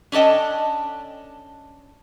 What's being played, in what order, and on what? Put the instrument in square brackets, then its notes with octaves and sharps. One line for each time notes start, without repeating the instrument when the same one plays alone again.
[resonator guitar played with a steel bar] C#4 D4 A4 D#5 G5